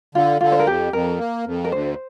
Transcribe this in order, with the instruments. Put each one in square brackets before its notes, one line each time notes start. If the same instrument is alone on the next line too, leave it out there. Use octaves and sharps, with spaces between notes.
[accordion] D3 [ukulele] F4
[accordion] D3 [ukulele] F4
[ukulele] C5
A#4
[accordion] F2 [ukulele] G4
[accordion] F2 [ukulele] A#4
[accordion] A#3
F2
[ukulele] A#4
[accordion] D2 [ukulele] C5